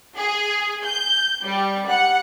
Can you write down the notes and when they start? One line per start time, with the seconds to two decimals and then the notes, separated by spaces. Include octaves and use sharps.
0.17 G#4
0.83 G6
1.43 G3
1.88 F#5